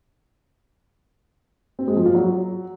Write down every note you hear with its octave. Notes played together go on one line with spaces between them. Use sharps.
C4
G#3
F3
F4
F#3